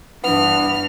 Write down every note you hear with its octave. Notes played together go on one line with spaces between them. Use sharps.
G2 E3 B3 D4 F6